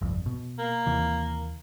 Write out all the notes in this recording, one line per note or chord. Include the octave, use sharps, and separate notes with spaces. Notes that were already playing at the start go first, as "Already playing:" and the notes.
G1 C2 F2
B2
A#3
D#2 C3 E3